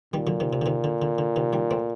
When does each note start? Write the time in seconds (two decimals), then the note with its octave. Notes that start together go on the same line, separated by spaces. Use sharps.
0.13 A#2 D#3 G3
0.27 D3 F#3
0.40 C3 D#3
0.53 C3
0.62 D3
0.66 C3 D#3
0.84 D3
1.02 D3
1.18 D3
1.36 C3 D#3
1.53 D#3 G3
1.71 A3 C4